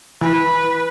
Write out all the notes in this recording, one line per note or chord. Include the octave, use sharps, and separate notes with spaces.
E3 B4